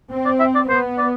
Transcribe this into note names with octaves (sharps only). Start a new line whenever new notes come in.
C4
D5
E5
D5
B3 C5
D5